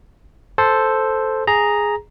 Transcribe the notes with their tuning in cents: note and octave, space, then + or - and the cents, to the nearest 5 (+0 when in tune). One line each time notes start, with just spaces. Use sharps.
A4 +0 C5 +0
G#4 +0 A#5 +0